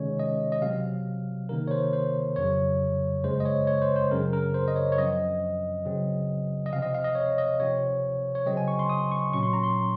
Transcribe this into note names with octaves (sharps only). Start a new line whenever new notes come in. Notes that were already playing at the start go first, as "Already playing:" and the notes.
Already playing: C3 D#3 G#3 C#4 C#5
D#5
D#5
C3 F#3 C4 F5
C3 D#3 A#3 A#4
C#5
C5
C5
F2 C#3 F#3 C#5
F#2 C#3 G#3 C5
D#5
C#5
C#5
C5
C5
F#2 C#3 F#3 C4 A#4
A#4
C5
D#5
C#5
C#5
F#2 F3 C4 D#5
C#3 F#3 C4
D#5
C3 F3 C4 F5
D#5
F5
D#5
C#5
D#5
C3 F3 C4 C#5
C#5
C#3 F#3 C4 D#5
G#5
C#6
C6
D#6
C#6
A#2 F#3 C#4 C#6
C6
A#5
C6